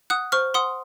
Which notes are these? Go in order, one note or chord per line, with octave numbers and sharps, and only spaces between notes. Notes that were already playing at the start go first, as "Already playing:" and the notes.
F#5 D#6 F#6
C5 C#6 F6
F#5 C6 D#6